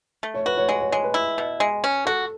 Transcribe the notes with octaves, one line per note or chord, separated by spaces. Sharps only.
A3
C#5
F#4 B4
C#5
G#3 C#5
C#5
G#3 C#5
B4
E4
B2
G#3
C#4
F#4 A4